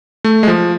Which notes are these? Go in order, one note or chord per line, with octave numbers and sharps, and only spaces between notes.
A3
G#3
F3